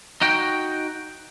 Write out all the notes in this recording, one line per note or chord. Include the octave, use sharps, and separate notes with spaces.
D#4 F#4 G5